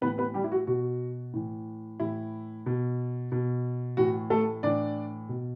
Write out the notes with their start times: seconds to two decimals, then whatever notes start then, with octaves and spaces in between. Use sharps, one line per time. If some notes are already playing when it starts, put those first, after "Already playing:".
0.01 A2 B3 B4
0.05 E3
0.18 B3 B4
0.34 G3 G4
0.44 E4
0.52 F#4
0.67 B2 F#4
1.33 A2 E3
2.00 A2 E3 E4
2.66 B2
3.32 B2
3.97 A2 E3 F#4
4.30 A3 A4
4.63 A2 E3 D4 D5
5.29 B2